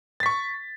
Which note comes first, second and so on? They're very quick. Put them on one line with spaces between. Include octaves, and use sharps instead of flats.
A6 B6 C#6